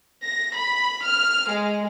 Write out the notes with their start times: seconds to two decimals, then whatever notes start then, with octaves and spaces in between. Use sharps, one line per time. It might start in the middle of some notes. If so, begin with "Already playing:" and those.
0.25 A#6
0.56 B5
1.05 F6
1.52 G#3